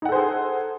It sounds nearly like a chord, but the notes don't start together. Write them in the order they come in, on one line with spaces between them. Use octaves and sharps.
D#4 F#5 A4 C5 G#4